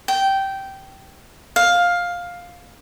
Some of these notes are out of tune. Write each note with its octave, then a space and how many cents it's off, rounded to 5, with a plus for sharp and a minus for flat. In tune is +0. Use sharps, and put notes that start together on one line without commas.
G5 -15
F5 +10